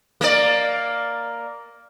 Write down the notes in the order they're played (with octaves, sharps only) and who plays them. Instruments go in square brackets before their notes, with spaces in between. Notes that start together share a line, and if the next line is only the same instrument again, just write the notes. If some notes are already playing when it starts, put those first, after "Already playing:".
[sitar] A#3 D5